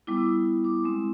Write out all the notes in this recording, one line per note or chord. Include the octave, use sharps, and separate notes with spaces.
G3 B3 E4 D6
E6
D#6
D#6
D6
G#3 C4 E4 D#6